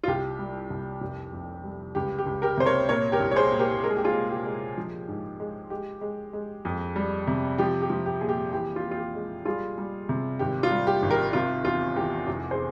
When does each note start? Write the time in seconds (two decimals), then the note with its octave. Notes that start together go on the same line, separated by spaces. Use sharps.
0.04 F4
0.08 C2 G4
0.39 G3
0.70 C2
1.01 F1
1.33 F2
1.64 G3
1.95 C#2 G4
2.18 G4
2.26 C#2
2.42 G4 A#4
2.57 C3 C5
2.65 A#4 C#5
2.89 A#2 A#4 C#5
3.12 G4 A#4
3.20 C2
3.31 C#5
3.36 G#4 C5
3.52 A#2
3.59 G4 A#4
3.83 G#3 A#4
3.90 G#4
3.97 G4
4.04 F4 G#4
4.14 G#3
4.31 G4
4.45 G#3
4.78 F3
5.08 G#2
5.40 G#3
5.70 G#3 G4
6.01 G#3
6.33 G#3
6.65 F2
6.96 G3
7.27 C3
7.58 F3 G4
7.82 G4
7.90 F3
8.06 G4
8.21 A#2 G#4
8.29 G4
8.53 E3 G4
8.76 F4
8.84 E3
8.91 F4
8.99 G4
9.15 G#3
9.45 G3 F4 G#4
9.78 G3
10.09 C3
10.39 G#1 G4
10.63 F4
10.71 G3
10.87 G4
11.02 G#1
11.10 G4 A#4
11.33 C3 F4
11.65 E2 F4
11.96 E2 G4
12.27 F1
12.51 G#4 C5